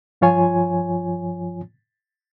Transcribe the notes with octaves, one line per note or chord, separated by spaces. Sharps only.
G2 F3 F4 C#5 G#5